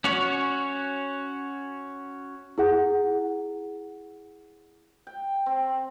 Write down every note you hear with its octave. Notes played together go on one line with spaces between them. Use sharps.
C#4 F#4 C#5
E4 G#4 F#5
G5
C4